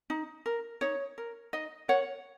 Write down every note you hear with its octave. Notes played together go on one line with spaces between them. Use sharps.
D#4
A#4
D#4 C#5
A#4
D#4 D#5
A#4 C#5 F#5